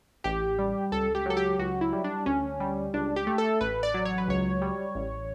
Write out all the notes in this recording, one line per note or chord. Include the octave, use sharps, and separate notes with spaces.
A1 G4
G3
C#2 A4
G4
F#3 A4
G4
C#2 F#4
E4
G3
D4
D2 C#4
G3
C#2 D4
G4
A3
A4
A1 B4
D5
F#3
C#5
B4
C#2 C#5
G3
A1